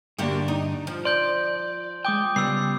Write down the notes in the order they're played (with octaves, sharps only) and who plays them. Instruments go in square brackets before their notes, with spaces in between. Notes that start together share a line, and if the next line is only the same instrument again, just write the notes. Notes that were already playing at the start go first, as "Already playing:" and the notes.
[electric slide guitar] G2 D3 D4 [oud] A#3 F#4 G4
[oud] D#4
F3
[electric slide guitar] D5 [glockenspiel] C6 G6
[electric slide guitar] G#3 G5 [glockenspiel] D6 D#6 G6
[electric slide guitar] C#3 G3 B3 [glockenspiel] E6 C7